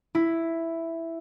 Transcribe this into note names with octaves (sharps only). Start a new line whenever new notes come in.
E4